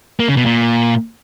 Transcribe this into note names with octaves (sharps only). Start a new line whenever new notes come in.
A#3
C#3
B2
A#2